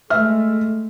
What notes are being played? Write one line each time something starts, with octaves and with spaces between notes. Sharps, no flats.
G#3 A3 E5 F6